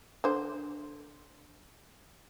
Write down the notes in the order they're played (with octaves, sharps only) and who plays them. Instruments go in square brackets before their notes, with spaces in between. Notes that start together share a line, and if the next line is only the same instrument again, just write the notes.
[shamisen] D3 C5